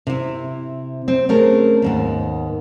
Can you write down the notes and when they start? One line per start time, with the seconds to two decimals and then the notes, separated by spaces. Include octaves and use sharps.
0.07 C3 E4
1.08 C4
1.29 A3 C4 C#4 G#4 A#4
1.82 D#2 G#2 B3